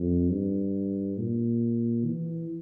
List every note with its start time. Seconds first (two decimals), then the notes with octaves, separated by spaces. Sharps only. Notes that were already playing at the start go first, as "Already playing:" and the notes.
Already playing: F2
0.31 G2
1.18 A#2
2.05 E3